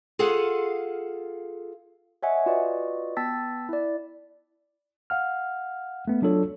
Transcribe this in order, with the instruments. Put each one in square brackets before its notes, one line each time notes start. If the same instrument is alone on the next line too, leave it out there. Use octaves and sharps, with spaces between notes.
[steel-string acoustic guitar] F4 G#4 A4 F5 F#5
[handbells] C#5 D#5 E5 F#5 G#5
F4 F#4 B4 D5 D#5
B3 G5 A5 E6 A6 B6
E4 D5
[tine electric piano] F5 F#5 F6
A3 B3
F#3 D4 F4 A4 C#5